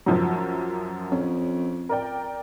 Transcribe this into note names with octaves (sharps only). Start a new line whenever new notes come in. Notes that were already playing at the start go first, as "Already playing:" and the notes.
F#2 F3 F#3
F2 C#4
A#4 D5 G5